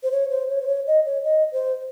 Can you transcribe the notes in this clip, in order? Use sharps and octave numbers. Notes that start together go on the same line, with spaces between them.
C5
C#5
C5
C#5
C5
C#5
D#5
C#5
D#5
C5